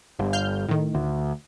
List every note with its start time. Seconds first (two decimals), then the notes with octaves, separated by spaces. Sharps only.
0.19 G1
0.33 F5 F6 G6
0.69 A2 D#3
0.95 D2